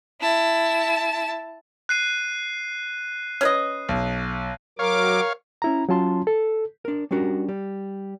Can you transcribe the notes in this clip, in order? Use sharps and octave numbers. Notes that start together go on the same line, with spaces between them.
E4 A5
F#6 C7 D#7
C#4 B4 D#5
B1
F#3 A#4 C#5 F5 D6
C#4 E4 A#5
F#3 C#4 F4 A5 C6
A4
D4 A#4
G3 C#4 D4 F#4 A#4
G3